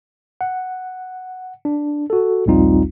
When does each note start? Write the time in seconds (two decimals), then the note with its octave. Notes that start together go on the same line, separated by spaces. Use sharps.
0.41 F#5
1.65 D4
2.10 F#4 A4
2.46 A#1 D#2 G3 C4 D#4 F4